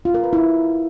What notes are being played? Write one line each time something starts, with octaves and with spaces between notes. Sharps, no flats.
F4
A#4
B4
E4